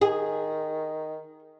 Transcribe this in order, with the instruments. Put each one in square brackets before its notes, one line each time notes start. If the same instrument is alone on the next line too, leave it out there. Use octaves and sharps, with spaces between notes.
[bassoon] D#3 [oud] G#4